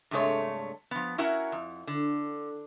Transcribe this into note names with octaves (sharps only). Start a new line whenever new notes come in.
G2 C3 G#3 A3 C#5
F3 B3
C#4 E4 F#4 A#4 F#5 A#5
F2
D3